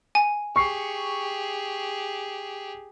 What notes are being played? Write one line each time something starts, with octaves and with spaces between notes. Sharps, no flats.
G#5
G4 G#4 C#6 C7